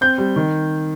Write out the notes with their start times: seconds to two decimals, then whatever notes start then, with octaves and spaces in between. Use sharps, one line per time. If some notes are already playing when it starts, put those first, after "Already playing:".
0.01 C4 G6
0.18 G3
0.36 D#3